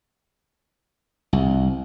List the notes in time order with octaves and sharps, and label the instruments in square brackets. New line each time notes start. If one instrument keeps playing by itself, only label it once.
[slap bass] C2